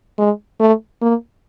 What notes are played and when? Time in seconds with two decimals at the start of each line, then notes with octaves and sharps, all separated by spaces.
0.18 G#3
0.60 A3
1.02 A#3